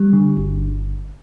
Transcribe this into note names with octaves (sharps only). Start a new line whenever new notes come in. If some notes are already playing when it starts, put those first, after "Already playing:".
Already playing: G3
D3
G1